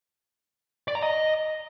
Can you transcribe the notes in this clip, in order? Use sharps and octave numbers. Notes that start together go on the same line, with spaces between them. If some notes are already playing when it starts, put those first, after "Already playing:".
D5
A#5
D#5